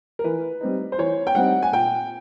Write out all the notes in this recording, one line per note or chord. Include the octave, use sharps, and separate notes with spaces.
A#4
E3 B4
G3 C4 D#4
C5
E3 C#5
G5
G3 C4 D#4 F#5
G#5
A#2 G5